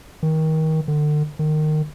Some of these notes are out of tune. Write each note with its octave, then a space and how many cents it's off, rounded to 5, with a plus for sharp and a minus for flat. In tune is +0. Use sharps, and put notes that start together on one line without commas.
D#3 +25
D3 +35
D#3 -20